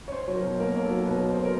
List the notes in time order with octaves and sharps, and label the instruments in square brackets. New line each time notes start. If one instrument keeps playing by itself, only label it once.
[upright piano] C#5
C#4 C5
F#3
A#4
B2
A#3 A#4
C#4
A4
F#3
B2 B4
A#3
C5
C#4
A#4